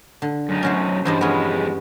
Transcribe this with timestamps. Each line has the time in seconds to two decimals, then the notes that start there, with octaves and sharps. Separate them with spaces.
0.22 D3
0.49 F#2 D#4
0.63 C#4 F#4 C5
1.05 E2 G2 E3 C5 D#5
1.21 F2 G#3 B3 C#4